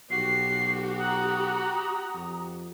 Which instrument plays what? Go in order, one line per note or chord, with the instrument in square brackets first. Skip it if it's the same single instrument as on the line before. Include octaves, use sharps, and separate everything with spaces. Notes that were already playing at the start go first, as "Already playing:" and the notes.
[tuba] B1 [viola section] F#4 G4 [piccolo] C7
[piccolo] F#5 [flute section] A#5 D#6
[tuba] F2